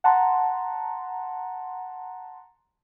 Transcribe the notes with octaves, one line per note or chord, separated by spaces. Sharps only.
F#5 A5 A#5 C6